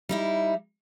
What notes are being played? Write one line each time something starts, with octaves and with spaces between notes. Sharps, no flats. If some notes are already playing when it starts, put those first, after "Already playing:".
G3 D#4 E4